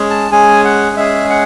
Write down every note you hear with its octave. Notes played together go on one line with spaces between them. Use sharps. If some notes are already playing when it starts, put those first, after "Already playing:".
Already playing: G#3 C#4 G#4
A5
G#3 C#4 G#4 G#5
F#5
G#3 C#4 G#4 E5
F#5